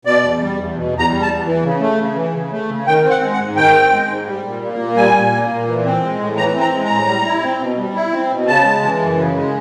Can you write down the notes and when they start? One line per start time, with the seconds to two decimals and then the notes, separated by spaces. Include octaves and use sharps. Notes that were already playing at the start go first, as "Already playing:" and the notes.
0.05 B2 D5
0.23 E2
0.41 G3
0.59 E2
0.76 B2
0.93 E2
0.99 A#5
1.10 G3
1.22 A5
1.28 E2
1.45 E3
1.63 C#3
1.81 A3
1.99 C#3
2.16 E3
2.33 C#3
2.52 A3
2.68 C#3
2.86 D#3 G5
3.04 C4
3.10 F#5
3.21 G#3
3.33 F#5
3.39 G#2
3.56 D#3 G5
3.73 C4
3.92 G#3
4.09 G#2
4.26 G3
4.44 A#2
4.62 A#3
4.79 A#2
4.96 G3 G#5
5.14 A#2
5.32 A#3
5.50 A#2
5.68 E3
5.85 C4
6.03 G#3
6.19 A2
6.37 E3 A#5
6.55 C4
6.60 A#5
6.73 G#3
6.85 A#5
6.90 A2
7.07 G3
7.25 E4
7.43 C4
7.60 B2
7.78 G3
7.95 E4
8.12 C4
8.31 B2
8.47 C#3 A5
8.65 G#3
8.83 E3
9.01 F#2
9.18 C#3
9.36 G#3